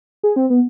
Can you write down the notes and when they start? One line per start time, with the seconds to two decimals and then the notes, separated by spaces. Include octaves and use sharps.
0.23 G#4
0.36 C4
0.50 B3